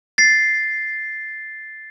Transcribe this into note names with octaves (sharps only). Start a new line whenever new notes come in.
A6 C7